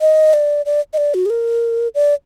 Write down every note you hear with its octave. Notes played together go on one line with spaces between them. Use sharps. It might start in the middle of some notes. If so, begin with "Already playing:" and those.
D#5
D5
D5
D#5
D5
F#4
G#4
A#4
D5